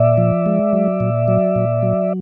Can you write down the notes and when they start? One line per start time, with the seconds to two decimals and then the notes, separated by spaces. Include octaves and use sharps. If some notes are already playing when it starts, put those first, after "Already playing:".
Already playing: A#2 D5 E5
0.18 F3
0.46 G#3
0.73 F#3
1.00 A#2
1.28 F#3
1.56 A#2
1.82 F#3